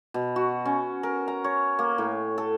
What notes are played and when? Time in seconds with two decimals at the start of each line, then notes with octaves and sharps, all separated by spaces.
0.14 B2
0.36 F#4
0.65 C#4
1.03 A#4
1.28 A#5
1.44 C#5
1.79 A#3
1.98 A2
2.38 A4